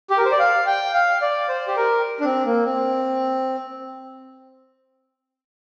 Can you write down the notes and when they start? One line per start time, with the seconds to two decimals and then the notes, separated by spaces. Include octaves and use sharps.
0.10 G4
0.18 A#4
0.25 C5
0.32 D5
0.39 F5
0.67 G5
0.94 F5
1.22 D5
1.49 C5
1.68 G4
1.77 A#4
2.20 D4
2.25 C4
2.45 A#3
2.65 C4